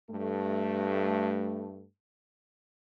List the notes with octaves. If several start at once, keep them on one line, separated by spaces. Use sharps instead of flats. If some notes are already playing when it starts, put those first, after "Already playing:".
G2 A3